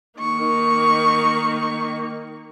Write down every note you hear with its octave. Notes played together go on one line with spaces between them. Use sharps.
D#3 A#3 C#6